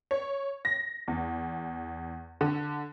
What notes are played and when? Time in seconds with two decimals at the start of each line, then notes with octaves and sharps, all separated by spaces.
0.11 C#5
0.65 A#6
1.08 E2
2.41 D3